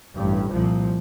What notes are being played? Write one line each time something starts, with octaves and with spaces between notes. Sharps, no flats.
A1 G2
C2 A#2 F3